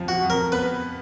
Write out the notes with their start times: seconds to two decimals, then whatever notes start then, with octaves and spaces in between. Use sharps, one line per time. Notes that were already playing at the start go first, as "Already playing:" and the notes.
Already playing: F2 F3
0.08 F#4
0.23 F2
0.30 A#4
0.52 B3 B4